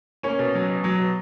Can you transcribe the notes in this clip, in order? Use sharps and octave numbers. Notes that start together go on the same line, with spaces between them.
A#3 C#4 C#5
B2
F#3
B2
F#3
B2